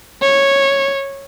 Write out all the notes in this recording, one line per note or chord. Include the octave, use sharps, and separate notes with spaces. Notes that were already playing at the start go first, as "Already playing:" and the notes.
C#5